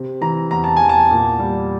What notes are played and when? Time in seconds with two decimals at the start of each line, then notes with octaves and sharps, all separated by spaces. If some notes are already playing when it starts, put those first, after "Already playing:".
Already playing: C3
0.21 E3 A#5
0.51 E2 A#5
0.64 A5
0.76 E2 G#5
0.89 A5
1.11 A#2
1.39 G3